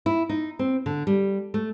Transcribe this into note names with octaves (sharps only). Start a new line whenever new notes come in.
E4
D#4
C4
D3
G3
A3